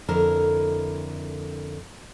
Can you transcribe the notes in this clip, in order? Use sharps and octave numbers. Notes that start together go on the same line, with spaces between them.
F2 D3 E4 A#4